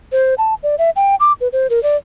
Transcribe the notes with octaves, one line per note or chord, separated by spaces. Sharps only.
C5
A5
D5
E5
G5
D6
B4
C5
A#4
D5